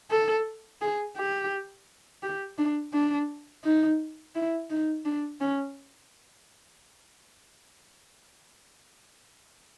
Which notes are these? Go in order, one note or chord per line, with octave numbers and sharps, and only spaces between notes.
A4
G#4
G4
G4
D4
D4
D#4
E4
D#4
D4
C#4